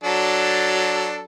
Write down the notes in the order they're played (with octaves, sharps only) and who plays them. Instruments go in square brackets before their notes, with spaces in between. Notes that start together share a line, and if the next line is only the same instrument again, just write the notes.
[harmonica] F#3 D4 A4